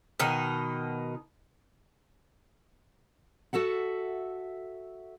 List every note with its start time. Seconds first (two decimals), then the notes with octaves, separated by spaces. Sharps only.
0.20 B2 D#3 D#4
3.53 F#4 A4 E5 F#5